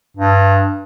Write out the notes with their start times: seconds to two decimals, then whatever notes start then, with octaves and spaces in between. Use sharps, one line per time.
0.17 G2